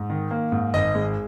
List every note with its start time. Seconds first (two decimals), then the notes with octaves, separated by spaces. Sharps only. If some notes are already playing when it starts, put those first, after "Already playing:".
Already playing: G#2
0.10 D#3
0.31 A#3
0.52 G#2
0.74 G#1 D#5
0.95 G#3